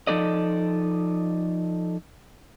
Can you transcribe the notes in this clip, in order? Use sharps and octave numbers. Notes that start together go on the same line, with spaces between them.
F3 D#4 A4 D5 D#5